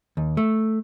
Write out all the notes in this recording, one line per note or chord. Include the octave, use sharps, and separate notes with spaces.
D#2
A3